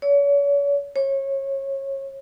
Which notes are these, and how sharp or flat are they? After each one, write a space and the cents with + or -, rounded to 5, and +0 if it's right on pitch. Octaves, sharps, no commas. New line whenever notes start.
C#5 +40
C#5 -25